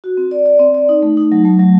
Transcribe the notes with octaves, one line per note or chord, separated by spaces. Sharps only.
F#4
C4
D5
D5
C4
D5
D#4
A3
D#4
F#3
A3
F#3